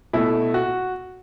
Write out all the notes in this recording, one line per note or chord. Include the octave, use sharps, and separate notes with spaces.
B2 A3 E4
F#4